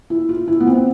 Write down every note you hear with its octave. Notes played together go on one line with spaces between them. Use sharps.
E4
F4
E4
B3
C4